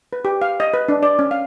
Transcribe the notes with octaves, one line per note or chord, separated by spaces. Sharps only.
B4
G4
F5
D#5
B4
D4
D5
C#4
F5